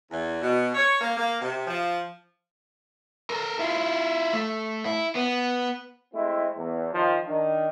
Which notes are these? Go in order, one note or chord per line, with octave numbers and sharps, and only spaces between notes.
E2
B2
C#5
A#3
A#3
C3
F3
A4 A#4
E4 F4
A3
E4
B3
G#3 A3 C4 E4
E2
D#3 F3
D#3 D4